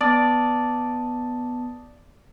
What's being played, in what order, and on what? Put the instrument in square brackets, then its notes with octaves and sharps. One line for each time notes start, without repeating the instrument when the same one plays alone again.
[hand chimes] B3 A5 D#6 [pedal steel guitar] D5